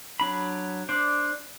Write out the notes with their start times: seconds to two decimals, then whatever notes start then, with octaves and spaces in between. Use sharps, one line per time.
0.20 F#3 D4 B5
0.89 D4 C5 D5